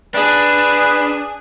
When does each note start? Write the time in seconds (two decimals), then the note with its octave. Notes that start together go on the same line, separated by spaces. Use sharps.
0.14 D4 G#4 B4